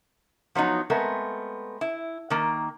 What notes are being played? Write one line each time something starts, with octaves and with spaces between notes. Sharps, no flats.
F3 F#3 B3 D#4
G#3 A3 B3 C4 A#4
E4
D#3 A#3